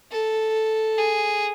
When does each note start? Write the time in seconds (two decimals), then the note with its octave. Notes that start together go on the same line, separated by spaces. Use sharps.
0.12 A4
0.98 G#4